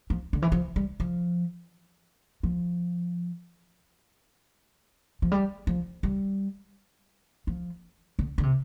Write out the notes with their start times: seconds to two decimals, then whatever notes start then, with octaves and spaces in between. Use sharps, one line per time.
0.10 F3
0.33 D3
0.42 E3
0.52 F3
0.76 G3
1.00 F3
2.43 F3
5.22 F3
5.32 G3
5.67 F3
6.03 G3
7.47 F3
8.19 D3
8.38 D3
8.43 C3